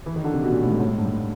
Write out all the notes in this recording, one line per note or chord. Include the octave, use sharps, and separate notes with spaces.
E3
D#3
D3
C3
B2
A#2
A2
G#2
A2
G#2
G2
G#2